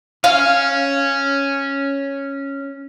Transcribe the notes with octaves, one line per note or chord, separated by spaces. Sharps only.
C#4 F5